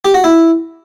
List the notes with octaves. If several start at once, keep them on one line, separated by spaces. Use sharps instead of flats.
G4
F#4
E4